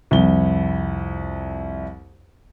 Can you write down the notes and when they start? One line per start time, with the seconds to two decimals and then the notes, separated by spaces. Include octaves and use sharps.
0.11 C2 F2 G7